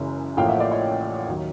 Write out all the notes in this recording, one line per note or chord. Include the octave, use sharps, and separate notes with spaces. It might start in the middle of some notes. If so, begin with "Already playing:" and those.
Already playing: F#1 F#2 C#3 E3 G#3
A1 A2 F3 A#3 F5 G5
E5 F#5
D5 E5
C#5 D#5
D#2 D#3 F#3